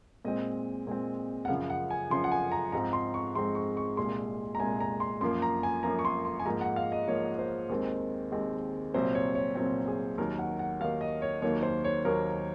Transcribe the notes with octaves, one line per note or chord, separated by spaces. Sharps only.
A#2 G#3 C4 D#5
A#2 G#3 C4
F#5
F#2 C#3 F3 F5
F#5
G#5
F#2 C#3 F3 C6
F#5
G#5
A#5
G#2 F3 G#3 C4 A#5
C6
C#6
G#2 F3 G#3 C4 C6
C#6
C#6
C2 A#2 G#3 C6
A#5
C2 A#2 G#3 G#5
A#5
C6
F#2 F3 A#3 C6
A#5
G#5
F#2 F3 A#3 A#5
C#6
C6
C6
G#5
G#2 F3 A#3 A#5
F#5
F5
D#5
G#2 F3 A#3 C#5
C5
D#2 D#3 G#3 C4
D#2 D#3 G#3 C4
C2 A#2 F#3 C4 C5
C#5
C#5
C2 A#2 F#3 C4 C#5
G#4
D#2 D#3 F#3 A#4
F#5
F#5
D#2 D#3 F#3 F5
D#5
C#5
D#2 D#3 F#3 A#3 C#5
C5
C#5
D#2 D#3 F#3 A#3 A#4